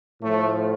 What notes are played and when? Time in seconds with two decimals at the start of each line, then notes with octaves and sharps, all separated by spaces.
0.21 A2 F3 A3